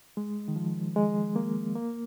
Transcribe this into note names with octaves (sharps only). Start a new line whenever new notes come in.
G#3
D#3
F3
G#3
A#3
A#3